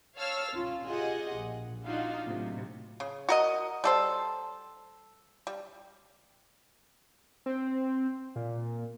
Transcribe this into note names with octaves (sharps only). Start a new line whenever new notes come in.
C#5 F5 A5 E6 F6
C#4 F4
F4 G4 G#4 D#5 F#5
A#1
D4 D#4 F4 F#4 F5
A2 C3 F#3
C#3
F#4 A#4 D#5
G3 A4 C5
G3
C4
A#2